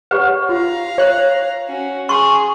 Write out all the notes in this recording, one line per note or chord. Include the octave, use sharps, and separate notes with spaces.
G4 B4 C#5 F#5
F4 F5 A#5
C#5 F#6
C#4 F#4
G#4 C6 C#6